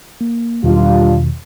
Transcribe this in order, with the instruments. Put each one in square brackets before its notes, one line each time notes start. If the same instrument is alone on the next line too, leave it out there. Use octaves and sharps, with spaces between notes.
[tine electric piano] A#3
[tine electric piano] E2 B2 D#3 [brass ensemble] G3 D4 F4